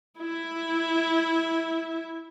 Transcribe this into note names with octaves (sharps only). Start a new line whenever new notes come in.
E4 E5